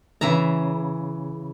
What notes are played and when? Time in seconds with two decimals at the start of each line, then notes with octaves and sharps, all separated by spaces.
0.21 C#3 E3 E5 A#5